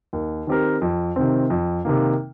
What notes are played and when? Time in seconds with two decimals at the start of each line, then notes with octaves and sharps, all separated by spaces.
0.13 D#2
0.47 D#3 C4 G4 A#4
0.82 F2
1.16 C3 D#3 C4
1.50 F2
1.85 C3 D#3 A#3